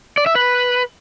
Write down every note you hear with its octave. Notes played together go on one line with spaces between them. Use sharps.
D5
E5
B4